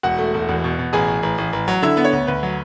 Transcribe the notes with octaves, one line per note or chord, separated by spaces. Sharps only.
E1 F#4 F#5
A3
E1
E2
B2
B2
A1 G#4 G#5
A1
A1
A1
A1
F#3
D3 E4 E5
B3
C#5
D2
D2 B4
F#3